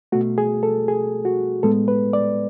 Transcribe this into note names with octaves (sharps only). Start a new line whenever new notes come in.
B2 A3 F#4
G#4
A4
G#4
F#4
A2 G#3 B3 A4
B4
D5